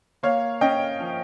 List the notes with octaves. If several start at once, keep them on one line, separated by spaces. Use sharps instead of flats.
A#3 C#5 F5
C#4 D#5 G5
F3